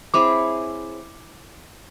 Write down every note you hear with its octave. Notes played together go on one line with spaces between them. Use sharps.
C4 E4 G#4 C#5 D6